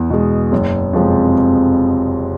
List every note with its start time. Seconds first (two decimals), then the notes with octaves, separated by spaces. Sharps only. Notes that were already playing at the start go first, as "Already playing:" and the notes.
Already playing: E2
0.10 B2 G#3
0.52 F#1
0.93 F2 C3 F3 G#3